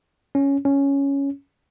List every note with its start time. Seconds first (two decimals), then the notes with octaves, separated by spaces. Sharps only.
0.35 C#4
0.65 C#4